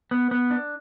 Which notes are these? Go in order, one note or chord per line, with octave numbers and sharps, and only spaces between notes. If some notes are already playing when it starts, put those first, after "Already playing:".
B3
B3
D4